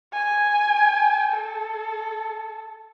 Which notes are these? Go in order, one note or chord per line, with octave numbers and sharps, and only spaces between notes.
G#5
A4